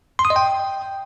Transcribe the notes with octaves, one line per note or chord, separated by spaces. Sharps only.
C6
D#6
D#5
G5